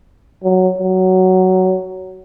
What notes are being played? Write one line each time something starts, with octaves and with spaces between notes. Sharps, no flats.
F#3
F#3